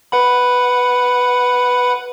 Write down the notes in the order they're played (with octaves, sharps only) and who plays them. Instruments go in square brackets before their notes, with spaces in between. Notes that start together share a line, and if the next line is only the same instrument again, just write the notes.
[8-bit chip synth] B4 F#5 B5